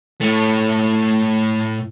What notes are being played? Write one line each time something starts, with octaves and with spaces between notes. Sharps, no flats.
A2 A3